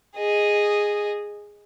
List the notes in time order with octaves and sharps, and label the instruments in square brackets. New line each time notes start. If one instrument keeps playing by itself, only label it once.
[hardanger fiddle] G#4 D#5